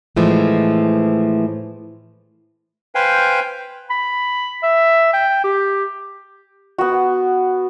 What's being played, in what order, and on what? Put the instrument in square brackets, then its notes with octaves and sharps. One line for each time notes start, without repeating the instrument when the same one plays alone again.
[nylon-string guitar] A2 E3 F3 G#3 A3
[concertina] B4 C5 F5 G5 G#5
[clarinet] B5
E5
G5
G4
[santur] B3 F#4